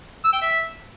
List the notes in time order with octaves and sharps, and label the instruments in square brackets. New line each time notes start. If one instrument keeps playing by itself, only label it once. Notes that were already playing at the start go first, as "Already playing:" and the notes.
[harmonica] E6
G5
E5